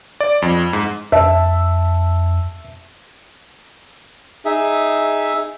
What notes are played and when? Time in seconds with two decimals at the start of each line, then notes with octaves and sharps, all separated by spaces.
0.20 D5
0.42 F2
0.73 G#2
1.12 F2 E5 A5
4.45 D#4 G#4 E5